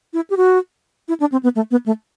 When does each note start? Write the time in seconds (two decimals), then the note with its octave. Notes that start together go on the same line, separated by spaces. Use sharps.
0.13 E4
0.30 G4
0.37 F#4
1.08 E4
1.20 D4
1.32 C4
1.43 B3
1.56 A3
1.71 B3
1.86 A3